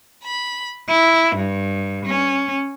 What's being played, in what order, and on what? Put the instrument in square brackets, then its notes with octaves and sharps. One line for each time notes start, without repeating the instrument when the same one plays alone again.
[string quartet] B5
E4
G2
C#4